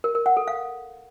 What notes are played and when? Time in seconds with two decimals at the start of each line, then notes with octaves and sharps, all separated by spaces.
0.04 A#4
0.15 A#4
0.26 F#5
0.37 A4
0.48 F5